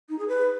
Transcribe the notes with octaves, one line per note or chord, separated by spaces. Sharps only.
D#4
G#4
B4